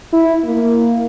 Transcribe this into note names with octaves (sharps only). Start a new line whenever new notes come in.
E4
A#3